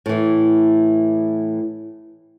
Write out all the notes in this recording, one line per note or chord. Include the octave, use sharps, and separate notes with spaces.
A2 E3